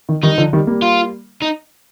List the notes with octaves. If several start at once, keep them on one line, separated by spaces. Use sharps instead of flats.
D#3
D#3 G3 D#4
D3 F3
D#3 G3
G3 A#3
F4
D#4